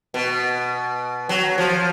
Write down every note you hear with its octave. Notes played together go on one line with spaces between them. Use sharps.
B2
F#3
F3